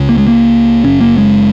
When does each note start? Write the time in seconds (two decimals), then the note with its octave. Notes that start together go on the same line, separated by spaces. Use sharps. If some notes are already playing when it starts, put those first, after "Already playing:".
Already playing: C#2 C#3
0.09 A#3
0.18 G#3
0.27 A#3
0.84 F#1 F#2 C#3 C#4
1.01 A#3
1.18 G#3